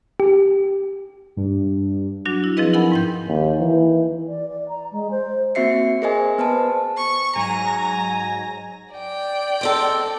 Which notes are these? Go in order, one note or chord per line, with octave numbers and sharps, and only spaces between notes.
G4
G2
F#3 D4 F#4
E4
F3 C4 E4 G#4 B4 D#5
D#4 E4 A#4 F#5 G#5 B5
G#2 G5 G6
D#2
E3
D5
D5
A#5
G#3
C5
A#3 C4 F#4 E5 C7 C#7
G#4 A#4 C5 D#5 G#5
B3 B4 C5 A5
C#6
G#2 F#3 G#5 A#5 A#6
D5 G5
G#3 C4 A4